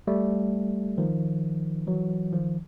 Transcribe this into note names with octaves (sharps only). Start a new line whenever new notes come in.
G3 A3
D#3 F3
E3 F#3
D#3 F3